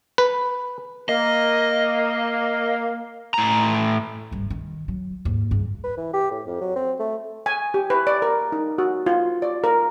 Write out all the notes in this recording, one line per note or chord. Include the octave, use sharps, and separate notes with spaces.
B4
A#3 D#5
A2 A#5
F#1 G2
D#3
F#3
D#2 G#2
G2 C#3
B4
E3
G4
A2
F2
F#3
C4
A3
G#5
G4
B4
D5
A#4
D#4
F#4
F4
D5
A#4